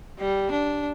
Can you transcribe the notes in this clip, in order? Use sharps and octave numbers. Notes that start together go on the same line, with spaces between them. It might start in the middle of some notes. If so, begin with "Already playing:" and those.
G3
D4